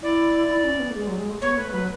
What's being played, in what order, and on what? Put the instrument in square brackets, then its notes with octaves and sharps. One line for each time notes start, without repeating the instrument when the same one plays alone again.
[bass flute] E4 [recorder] D5
[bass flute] E4
C#4
C#4
B3
A3
G#3
F#3
G#3
A3
[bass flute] B3 [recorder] C#5
[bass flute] A3 [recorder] B4
[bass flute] F#3 [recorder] B4